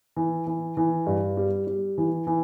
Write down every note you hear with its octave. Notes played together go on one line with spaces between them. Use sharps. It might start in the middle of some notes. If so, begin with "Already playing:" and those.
E3
E3
E3
G2
G3
G3
E3
E3